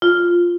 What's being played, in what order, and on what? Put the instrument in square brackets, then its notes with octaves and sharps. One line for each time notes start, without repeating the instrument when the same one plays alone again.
[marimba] F4